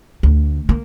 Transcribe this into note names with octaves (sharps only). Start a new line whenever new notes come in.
D2
A#3